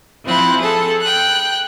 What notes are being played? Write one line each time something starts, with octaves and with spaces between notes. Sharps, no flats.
F3 C4 E4 F#6
G#4 A4 A5
G5 F#6